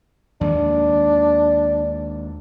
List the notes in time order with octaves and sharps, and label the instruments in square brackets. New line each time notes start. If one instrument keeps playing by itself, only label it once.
[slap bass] D#2 D#3 G#3 [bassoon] D4